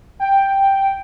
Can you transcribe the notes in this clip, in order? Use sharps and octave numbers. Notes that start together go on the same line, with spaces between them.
G5